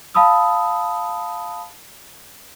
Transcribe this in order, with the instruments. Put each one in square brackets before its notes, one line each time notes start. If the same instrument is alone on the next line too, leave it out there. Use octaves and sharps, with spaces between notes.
[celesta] F5 A5 B5 D#6 E6